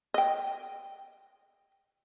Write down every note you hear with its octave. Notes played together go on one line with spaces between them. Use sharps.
D#5 G5